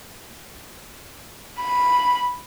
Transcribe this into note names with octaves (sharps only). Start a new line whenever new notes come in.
B5